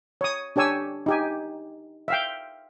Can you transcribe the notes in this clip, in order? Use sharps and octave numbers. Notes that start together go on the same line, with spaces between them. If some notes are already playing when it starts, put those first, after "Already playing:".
C#5 D#6
D4 G4 C#5 G#5 E6
D#4 G4 G#5
E5 F5 G5